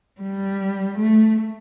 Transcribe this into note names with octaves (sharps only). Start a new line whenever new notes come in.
G3
A3